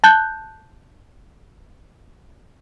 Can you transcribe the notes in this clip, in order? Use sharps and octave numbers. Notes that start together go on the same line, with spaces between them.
A5 F#6 G6